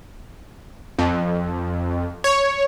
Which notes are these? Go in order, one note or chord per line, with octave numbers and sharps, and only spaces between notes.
F2
C#5